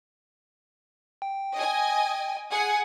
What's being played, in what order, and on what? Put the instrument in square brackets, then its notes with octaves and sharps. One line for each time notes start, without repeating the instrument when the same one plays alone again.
[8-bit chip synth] G5
[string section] D#5 G#5
G#4 F#5 G#5